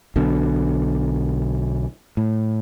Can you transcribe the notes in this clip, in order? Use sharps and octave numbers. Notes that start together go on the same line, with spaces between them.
B1 B2 D3
A2